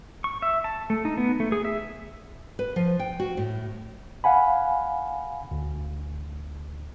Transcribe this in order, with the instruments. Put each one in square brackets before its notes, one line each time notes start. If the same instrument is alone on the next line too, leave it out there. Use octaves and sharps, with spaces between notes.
[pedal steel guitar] C#6
E5
A5
A3
D#4
B3
A3
G#4
E5
[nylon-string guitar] B4
F3
G5
F#4
A2
[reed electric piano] F5 F#5 G#5 B5
D2